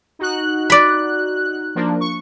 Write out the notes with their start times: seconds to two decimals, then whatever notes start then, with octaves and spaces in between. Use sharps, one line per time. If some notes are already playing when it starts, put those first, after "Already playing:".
0.19 D#4 F#4 F#6
0.70 D5 B5
1.75 F3 A#3 D4
2.01 C#6